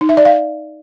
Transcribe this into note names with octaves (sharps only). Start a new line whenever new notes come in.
D#4
E5
D5
F5